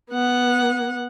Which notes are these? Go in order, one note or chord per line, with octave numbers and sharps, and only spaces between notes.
B3 F#5